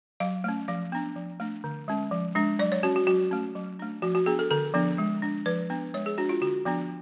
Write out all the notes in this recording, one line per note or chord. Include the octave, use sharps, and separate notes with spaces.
F#3 F5
A3 C#4
F3 F5
B3 D4
F3
A3 D4
D3
G#3 C#4
F3
G#3 D4
F#3 D5
C#5
C#4 F#4
F#4
F#3 F#4
A3 C#4
F#3
A3 D4
F3 F#4
F#4
B3 D4 G#4
A4
D3 A4
F3 B3 D4
G#3
D4
F3 B4
B3 D4
G#3 C#5
G#4
D4 F#4
F4
D3 F#4
F3 B3 D4